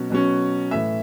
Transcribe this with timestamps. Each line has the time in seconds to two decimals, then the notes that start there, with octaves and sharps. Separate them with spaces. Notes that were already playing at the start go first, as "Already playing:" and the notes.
Already playing: B2 F#3 C#4
0.10 B2 F#3 C#4
0.71 A2 E3 A3 E5